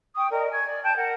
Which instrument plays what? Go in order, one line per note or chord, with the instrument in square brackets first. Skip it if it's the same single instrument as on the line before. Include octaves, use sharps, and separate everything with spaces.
[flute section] G5 C#6 D#6
A#4 D5 D#5
G#5 C#6 G#6
D5
G5 A5 G6
A#4 F#5